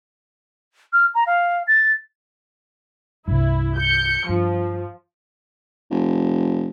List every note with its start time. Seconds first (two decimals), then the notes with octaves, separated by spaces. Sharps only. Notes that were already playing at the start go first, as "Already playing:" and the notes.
0.93 F6
1.15 A#5
1.27 F5
1.67 A6
3.28 C2 G2 E4
3.78 G6 C#7
4.29 G2 F3
5.91 F1